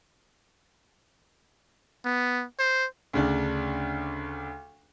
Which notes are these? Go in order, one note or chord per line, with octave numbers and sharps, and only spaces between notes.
B3
C5
D2 C#3 D4